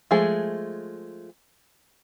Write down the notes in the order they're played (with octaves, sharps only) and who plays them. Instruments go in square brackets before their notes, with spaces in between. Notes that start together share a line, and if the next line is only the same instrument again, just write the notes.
[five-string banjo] F3 G#3 A3 G#4